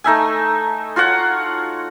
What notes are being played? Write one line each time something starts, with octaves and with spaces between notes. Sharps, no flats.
A3 D#4 E5 G#5
F4 F#4 C#5 F#5